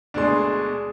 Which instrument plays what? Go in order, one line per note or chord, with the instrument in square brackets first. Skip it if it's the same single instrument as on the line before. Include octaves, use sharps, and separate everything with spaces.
[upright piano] D2 B2 C6 [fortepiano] G#3 D4